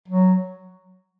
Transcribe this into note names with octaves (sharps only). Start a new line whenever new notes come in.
F#3